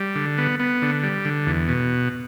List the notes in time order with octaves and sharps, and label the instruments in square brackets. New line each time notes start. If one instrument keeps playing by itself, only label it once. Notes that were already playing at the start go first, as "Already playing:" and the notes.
Already playing: [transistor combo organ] G3
D3
B3
B3
D3
G3
D3
E2
B2